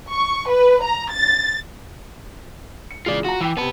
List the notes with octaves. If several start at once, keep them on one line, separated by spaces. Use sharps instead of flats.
C#6
B4
A#5
A6
C#7
C#3 E3 G#3 F4 D5
F4 F#4 A#5
E3 G5 D6 E6
C3 B3 B4 A5